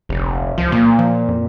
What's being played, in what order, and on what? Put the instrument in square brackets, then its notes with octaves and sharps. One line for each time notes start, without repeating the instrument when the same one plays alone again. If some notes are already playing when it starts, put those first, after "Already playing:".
[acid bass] F1 [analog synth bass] A#1
[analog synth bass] C#2 [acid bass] F3
[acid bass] A#2 [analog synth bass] A#3
[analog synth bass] F3
F2